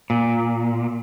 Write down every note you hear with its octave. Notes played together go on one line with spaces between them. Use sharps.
A#2